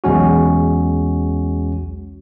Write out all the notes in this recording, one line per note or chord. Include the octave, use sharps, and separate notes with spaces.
B1 E2 G#3 C#4 F#4